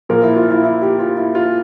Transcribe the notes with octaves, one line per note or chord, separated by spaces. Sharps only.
A#2 F3 A#4
E4
F4
E4
E4
G4
F4
E4
F4